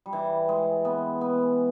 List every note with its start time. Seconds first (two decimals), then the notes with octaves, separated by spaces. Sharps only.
0.06 G3
0.13 E3
0.49 G#3
0.85 B3
1.21 B3